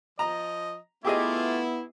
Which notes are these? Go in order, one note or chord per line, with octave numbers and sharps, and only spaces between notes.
F3 D#5 A#5
A3 B3 E4 F4 G4 G#4 D#5 D6